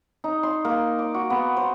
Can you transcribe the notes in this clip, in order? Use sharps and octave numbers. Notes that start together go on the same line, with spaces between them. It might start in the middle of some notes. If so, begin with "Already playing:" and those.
D#4
C6
A#3
D6
F#4
B3
C5